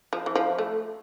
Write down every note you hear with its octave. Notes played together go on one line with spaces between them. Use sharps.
F3
E3
F3
A3